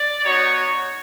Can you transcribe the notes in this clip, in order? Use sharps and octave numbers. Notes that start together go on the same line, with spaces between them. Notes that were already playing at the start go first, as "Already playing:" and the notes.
Already playing: D5
B3 D#4 F#4 C#5